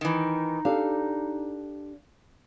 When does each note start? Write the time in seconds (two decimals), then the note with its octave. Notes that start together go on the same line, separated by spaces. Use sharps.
0.01 D#3 E3 D#4
0.65 D4 G4 A4 F5